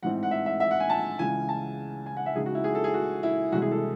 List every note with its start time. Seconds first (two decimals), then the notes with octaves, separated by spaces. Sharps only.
0.02 A1 G#2 E3 C4 F#5
0.23 F#5
0.31 E5
0.46 E5
0.60 E5
0.71 F#5
0.80 G#5
0.90 A5
1.19 C#2 C#3 E3 G#5
1.49 A5
2.06 G#5
2.17 F#5
2.26 E5
2.36 C#2 C#3 G#3 D#4 G#4
2.46 F#4
2.55 E4
2.64 G#4
2.75 A4
2.84 G#4
2.94 F#4
3.23 E4
3.52 C2 C3 E3 G#3 F#4
3.62 G#4
3.71 A4